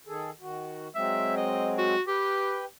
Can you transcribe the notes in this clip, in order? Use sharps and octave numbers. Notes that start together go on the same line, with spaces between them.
D#3 G#4 A4
D#3 F#4
F#3 G#3 C4 E5
D#5
F#4
G4 B4 G5